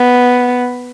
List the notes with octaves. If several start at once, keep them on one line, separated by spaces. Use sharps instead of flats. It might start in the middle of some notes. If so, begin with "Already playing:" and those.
Already playing: B3